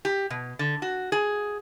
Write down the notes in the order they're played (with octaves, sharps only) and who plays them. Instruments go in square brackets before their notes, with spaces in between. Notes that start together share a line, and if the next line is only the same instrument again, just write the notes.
[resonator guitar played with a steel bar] G4
B2
D3
F#4
G#4